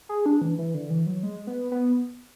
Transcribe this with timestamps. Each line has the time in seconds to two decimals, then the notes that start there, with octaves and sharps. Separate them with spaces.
0.09 G#4
0.26 D4
0.42 E3
0.59 E3
0.74 D3
0.90 E3
1.06 F#3
1.23 G#3
1.47 B3
1.72 B3